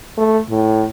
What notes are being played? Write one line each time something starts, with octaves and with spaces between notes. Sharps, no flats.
A3
A2